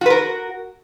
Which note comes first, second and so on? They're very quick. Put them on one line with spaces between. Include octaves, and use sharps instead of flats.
F#4 B4 A#4